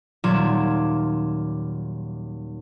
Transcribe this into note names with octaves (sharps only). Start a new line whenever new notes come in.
D#1 F#3 F4 D6 G#6 E7